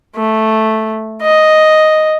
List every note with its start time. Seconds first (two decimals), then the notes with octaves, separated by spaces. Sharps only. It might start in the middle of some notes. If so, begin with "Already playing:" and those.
0.16 A3
1.22 D#5